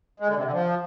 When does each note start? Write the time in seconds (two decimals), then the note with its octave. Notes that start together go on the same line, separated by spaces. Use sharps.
0.20 G#3
0.28 D3
0.36 C3
0.44 D3
0.52 F3